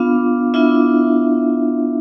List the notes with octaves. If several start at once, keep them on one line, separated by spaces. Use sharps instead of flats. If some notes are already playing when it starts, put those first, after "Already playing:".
Already playing: B3 D4 F4 F5
B3 D4 E4 F4 E5